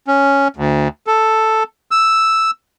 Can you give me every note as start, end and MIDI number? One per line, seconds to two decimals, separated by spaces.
0.07 0.48 61
0.57 0.88 38
1.07 1.63 69
1.91 2.51 88